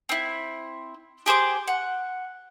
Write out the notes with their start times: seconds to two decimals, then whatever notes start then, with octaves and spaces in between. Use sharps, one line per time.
0.09 C4 E4
1.26 G4 G#4 C5 D6
1.68 F#5